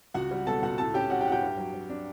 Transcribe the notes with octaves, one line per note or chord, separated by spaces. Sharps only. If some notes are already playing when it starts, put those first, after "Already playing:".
C#2 F#4 F#5
G3
B2 A4 A5
C#2 F#4 F#5
A2 A4 A5
C#4 G4 G5
C#4 F#4 F#5
G4 G5
A2 F#5
G4 G5
G2
F#3
F#3
D4